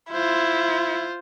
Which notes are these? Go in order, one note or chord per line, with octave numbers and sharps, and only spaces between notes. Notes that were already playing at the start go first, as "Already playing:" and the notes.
E4 F4 C5